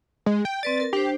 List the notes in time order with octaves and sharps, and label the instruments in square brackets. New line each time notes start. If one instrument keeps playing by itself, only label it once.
[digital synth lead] G#3
G5
[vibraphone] C4 B4 D5 [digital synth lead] A6
[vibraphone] A#4
[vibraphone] D4 C5 [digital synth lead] G4